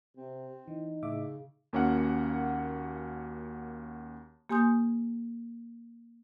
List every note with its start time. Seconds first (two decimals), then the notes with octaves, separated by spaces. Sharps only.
0.17 C3 C4
0.68 E3 D#4
1.02 A2 C#3 E5 D6
1.73 D#2 A#3 C#4 F#4 F#5
4.50 A#3 G4 G#5 C6 D#6 G6